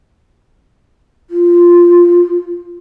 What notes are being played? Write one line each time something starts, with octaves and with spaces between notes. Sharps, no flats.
F4